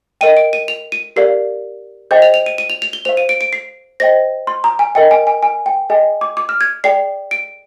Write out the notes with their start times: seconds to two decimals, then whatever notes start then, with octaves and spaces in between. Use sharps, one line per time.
0.21 A#4 D#5 G5 D#7
0.37 D7
0.53 D#7
0.68 F7
0.92 D#7
1.16 G4 A#4 D5 F5 C7
2.11 G#4 C5 D#5 G5 G6
2.22 F7
2.34 F7
2.46 D#7
2.58 D#7
2.70 F7
2.82 F7
2.93 G7
3.05 C5 F5 F7
3.17 D#7
3.29 D7
3.41 D7
3.53 C7
4.00 C5 D#5 G5 A#6
4.47 C6
4.64 A#5
4.79 G#5
4.95 A#4 D#5 G5
5.11 G#5
5.27 G#5
5.43 G#5
5.66 G5
5.90 G#4 D#5 G5 G#5
6.21 D6
6.37 D6
6.49 F6
6.61 G#6
6.84 G#4 D5 G5 C7
7.31 D7